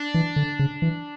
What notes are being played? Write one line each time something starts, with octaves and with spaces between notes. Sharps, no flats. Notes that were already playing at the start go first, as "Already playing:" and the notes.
Already playing: D4
E3
D3
C#3
E3